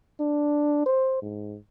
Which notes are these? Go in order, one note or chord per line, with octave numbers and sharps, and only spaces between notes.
D4
C5
G#2